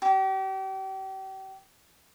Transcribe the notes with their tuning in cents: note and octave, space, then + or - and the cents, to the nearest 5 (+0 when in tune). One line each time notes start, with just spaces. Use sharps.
G4 -35